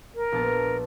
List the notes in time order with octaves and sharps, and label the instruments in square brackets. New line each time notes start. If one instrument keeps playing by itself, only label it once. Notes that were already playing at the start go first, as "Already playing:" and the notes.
[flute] A#4
[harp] A#1 B3 A5